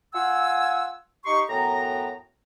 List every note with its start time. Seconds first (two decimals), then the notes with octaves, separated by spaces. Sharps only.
0.14 F4 F#5 G#5 E6
1.26 D#4 G4 C6 C#6
1.49 F#2 A2 B3 G5 A#5